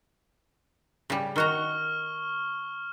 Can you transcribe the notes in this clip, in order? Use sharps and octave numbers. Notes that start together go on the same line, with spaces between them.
C#3 G3
D#3 F#4 A#5 C#6 F6 G7